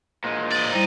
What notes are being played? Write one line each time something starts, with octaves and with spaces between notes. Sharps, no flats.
A#2 G#3
D5 D#5
G3 D#4 E4 C5